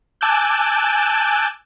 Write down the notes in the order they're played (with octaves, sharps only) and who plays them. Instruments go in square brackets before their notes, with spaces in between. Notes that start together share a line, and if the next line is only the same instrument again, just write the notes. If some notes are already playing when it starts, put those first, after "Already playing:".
[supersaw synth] G#5 A5 D6 E6 F#6 G6